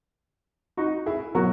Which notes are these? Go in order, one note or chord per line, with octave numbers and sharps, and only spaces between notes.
D#4 F#4
E4 G#4
B2 F#3 F#4 A#4